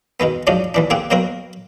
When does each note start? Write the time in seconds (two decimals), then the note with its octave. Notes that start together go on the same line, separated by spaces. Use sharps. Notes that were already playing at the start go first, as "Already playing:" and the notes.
0.20 B2 D#3 G#3 B3
0.47 G#2 F3 F#3 G#3 C#4 D4
0.74 D#2 E3 D4
0.90 A#3 C4 G4 G#4 F#5 G5
1.11 B2 F#3 A#3 C4 F#4 A#4